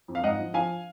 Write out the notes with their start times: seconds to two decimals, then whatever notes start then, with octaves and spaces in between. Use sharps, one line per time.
0.08 F2
0.15 F5
0.23 G#2 D#5 F#5
0.39 F3
0.54 F3 F5 G#5